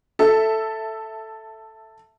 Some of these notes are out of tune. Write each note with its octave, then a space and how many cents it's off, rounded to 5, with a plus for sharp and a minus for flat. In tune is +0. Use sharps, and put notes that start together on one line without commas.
A4 +0 E5 +0